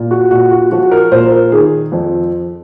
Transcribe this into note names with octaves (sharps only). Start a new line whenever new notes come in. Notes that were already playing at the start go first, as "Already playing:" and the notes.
Already playing: A#2
F#4
A#2 F#4
F#4
F3 F#4
A#4
A#2 C5
A#4
D#3 G#4
F2